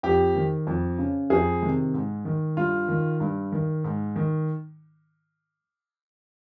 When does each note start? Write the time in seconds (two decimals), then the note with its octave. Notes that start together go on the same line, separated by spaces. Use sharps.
0.03 F2 G4
0.35 D#3
0.67 F2
0.99 C#3
1.30 F2 G#4
1.62 C3 D#3
1.94 G#2
2.25 D#3
2.57 G2 F4
2.89 D#3
3.20 G2
3.52 D#3
3.84 G#2
4.16 D#3